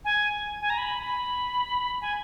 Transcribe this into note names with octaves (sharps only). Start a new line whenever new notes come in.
G#5
G#5
A#5
B5
B5
G#5